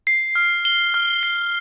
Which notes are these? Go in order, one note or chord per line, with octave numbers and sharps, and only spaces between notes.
C7
F6
G7
F6
C7